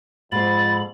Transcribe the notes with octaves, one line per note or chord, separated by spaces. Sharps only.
F2 G#2 B5 A6